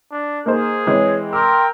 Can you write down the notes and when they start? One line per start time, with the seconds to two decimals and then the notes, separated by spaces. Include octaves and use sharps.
0.12 D4
0.46 A#3 D#4 G#4 C5
0.87 E3 G#3 C4 C#5
1.33 A#4 G5 C6 D6 E6